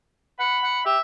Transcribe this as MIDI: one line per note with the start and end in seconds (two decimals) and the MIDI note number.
0.40 0.58 78
0.40 0.85 83
0.64 0.80 78
0.85 0.98 67
0.85 1.01 76